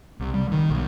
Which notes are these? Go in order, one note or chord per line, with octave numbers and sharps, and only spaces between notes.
C2
G3
D#3
B1